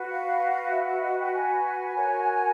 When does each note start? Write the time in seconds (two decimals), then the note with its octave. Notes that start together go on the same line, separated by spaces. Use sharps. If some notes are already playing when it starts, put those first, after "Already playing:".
Already playing: F#4 B4
0.10 F5
0.71 E5
0.87 E5
1.01 D#5
1.18 G5
1.33 G#5
1.94 F#4 A#4 C#5